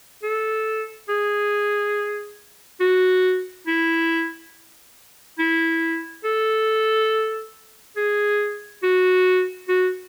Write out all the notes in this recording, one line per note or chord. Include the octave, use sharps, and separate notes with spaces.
A4
G#4
F#4
E4
E4
A4
G#4
F#4
F#4